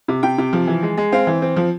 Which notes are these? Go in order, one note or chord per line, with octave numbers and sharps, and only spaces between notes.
C3
C3 G5
C3
F3
E3
G#3
G#3
C4 F5
E3
C4
F3